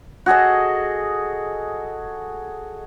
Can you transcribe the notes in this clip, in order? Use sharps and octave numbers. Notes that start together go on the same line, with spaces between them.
F#4 G#4 A4 D#5